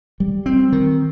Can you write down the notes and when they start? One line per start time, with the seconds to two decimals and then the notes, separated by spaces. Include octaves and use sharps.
0.20 G3
0.46 C4
0.72 D#3